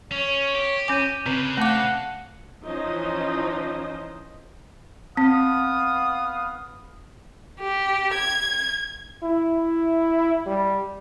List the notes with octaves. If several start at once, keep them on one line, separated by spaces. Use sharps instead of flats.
C#4 C#5
G4
C#4 C#5 G#5 D6 G6 D#7
C#3 C4 B4
A3 F5 F#5 A5 D6 A#6
E3 F3 C#4 D#4 C5 D#5
B3 C4 F5 D#6
G4
G#6
E4
G3